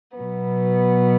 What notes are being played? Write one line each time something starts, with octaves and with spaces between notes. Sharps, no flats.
B2 F#3 B3